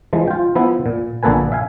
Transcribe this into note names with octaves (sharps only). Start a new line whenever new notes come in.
E3 F3 G#3
F4 G5
F3 B3 E4
A#2
A#1 D3 A#3 A4 B4 G#5
E5 F5 G#5